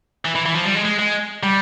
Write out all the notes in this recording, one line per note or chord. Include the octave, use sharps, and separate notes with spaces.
E3
E3
E3
F3
G3
G#3
G#3
G#3
G3